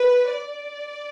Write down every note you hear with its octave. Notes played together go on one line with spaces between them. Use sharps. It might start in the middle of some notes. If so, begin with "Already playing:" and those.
Already playing: B4
D5